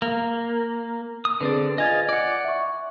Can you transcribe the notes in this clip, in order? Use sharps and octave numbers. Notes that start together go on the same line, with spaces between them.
A#3
D#6
D3 C4 G#4 B4 D5
F4 D#5 G#5 G#6 A6
D5 F#5
E5 C#6